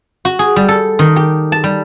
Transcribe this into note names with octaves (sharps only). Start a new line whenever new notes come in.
F#4
G#4
G3
A4
D#3
G4
A5
G3